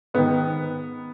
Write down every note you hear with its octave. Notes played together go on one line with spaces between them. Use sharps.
G#2 D#3 B3